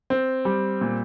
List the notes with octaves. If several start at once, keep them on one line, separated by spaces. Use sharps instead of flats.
C4
G3
A#2